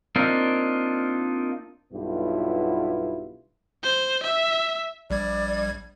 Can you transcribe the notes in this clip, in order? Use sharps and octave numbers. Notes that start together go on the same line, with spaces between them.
A#3 C4 D4 D#4 F4
B1 G2 B3 E4 F4
C5
E5
A#1 G3 D5 G#6